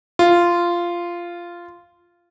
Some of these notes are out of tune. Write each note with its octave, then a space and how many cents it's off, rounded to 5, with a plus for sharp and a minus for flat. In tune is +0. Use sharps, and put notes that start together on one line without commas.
F4 -10